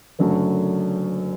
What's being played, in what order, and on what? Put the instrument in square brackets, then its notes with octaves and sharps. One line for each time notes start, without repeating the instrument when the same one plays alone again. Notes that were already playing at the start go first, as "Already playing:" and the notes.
[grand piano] F#1 F#2 D3 F#3 A3